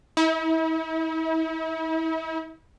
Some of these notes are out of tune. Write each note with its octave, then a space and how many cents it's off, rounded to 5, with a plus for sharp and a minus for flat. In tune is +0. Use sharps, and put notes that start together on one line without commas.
E4 -40